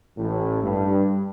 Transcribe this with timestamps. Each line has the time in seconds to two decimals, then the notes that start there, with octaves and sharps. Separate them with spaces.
0.18 A1 A2
0.63 G2